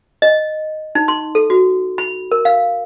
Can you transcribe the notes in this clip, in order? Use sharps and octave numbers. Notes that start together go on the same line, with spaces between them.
D#5
D#4
C6
A4
F#4
B5
A#4
F5